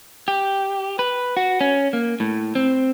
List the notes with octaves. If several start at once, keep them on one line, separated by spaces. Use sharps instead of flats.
G4
B4
F#4
C#4
A#3
A2
C4